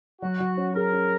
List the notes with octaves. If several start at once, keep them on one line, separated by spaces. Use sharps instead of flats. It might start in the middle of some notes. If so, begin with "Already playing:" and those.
F#3 F#4
F#3
C#4
G#4 A#4
C#4